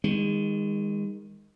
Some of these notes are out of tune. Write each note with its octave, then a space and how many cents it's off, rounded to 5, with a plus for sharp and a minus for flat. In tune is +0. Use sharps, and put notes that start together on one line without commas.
D#3 +0 G#3 -35